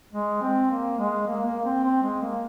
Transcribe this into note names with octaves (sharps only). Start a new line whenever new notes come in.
G#3
C4
A#3
G#3
A#3
A#3
C4
C4
G#3
A#3